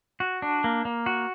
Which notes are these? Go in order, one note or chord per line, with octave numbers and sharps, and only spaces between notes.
F#4
D4
A#3
A#3
F#4